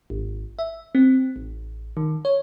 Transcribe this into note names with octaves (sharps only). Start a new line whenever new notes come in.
G#1
E5
C4
A1
D#3
C#5